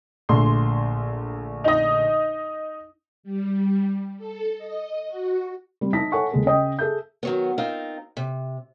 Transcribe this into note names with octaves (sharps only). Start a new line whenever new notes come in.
A#1 D3 A3 C6
D#4 D#5
G3
A4
D#5
F#4
G3 C4
D#4 E5 A5 A#6 B6
A4 C#5 E5 F#5 G#5 C#6
D#2 G#3 A4
C#3 D#5 G5
G#4 A4 E5 G6
D#3 F#3 B3
C4 D#4 F4 A#4 F5
C3